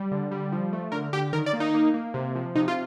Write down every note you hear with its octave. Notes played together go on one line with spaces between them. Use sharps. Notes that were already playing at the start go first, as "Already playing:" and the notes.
Already playing: G3
D3
G3
F3
A3
D3 A#4
D3 G4
D#3 A#4
D5
A#3
D#4
A#3
A#3
C3
F3
C3 D#4
F4